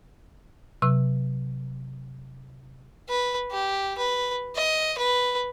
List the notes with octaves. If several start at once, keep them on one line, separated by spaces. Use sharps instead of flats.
C3 F#3 E6
B4
G4
B4
D#5
B4